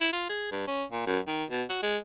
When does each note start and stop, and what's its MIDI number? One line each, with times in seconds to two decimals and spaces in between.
0.01 0.09 64
0.13 0.26 65
0.30 0.47 68
0.52 0.67 43
0.67 0.85 61
0.92 1.04 46
1.07 1.19 42
1.27 1.45 51
1.50 1.64 47
1.70 1.78 66
1.83 1.98 56